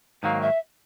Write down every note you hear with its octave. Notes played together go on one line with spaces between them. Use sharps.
G#2 D#3 F#3 A#3 F5
E5